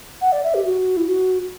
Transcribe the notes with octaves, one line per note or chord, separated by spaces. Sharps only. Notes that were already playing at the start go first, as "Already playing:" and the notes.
F#5
D5
E5
G4
F#4
E4
F#4